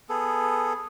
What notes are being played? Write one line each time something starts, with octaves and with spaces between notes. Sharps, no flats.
B3 G#4 A4